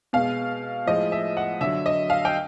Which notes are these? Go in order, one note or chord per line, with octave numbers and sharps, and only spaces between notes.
B2 G#3 F5
A2 F3 G#3 D#5
E5
F#5
D3 F#3 E5
D#5
F5
G5